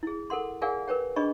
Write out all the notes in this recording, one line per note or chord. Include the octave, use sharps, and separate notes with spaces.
E4 G#4
A4 A#4 F#5 C6
G#4 A#4 D5 F5 F#5 G#5
A#4 B4 C#5 G5
D4 G#4 C#5 D#5 B5 C#6